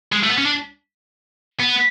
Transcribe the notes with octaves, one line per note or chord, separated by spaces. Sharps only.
G#3
A3
B3
C#4
D4
B3